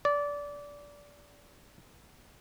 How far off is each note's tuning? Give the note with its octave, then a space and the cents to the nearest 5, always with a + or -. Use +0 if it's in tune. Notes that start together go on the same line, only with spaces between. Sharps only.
D5 -20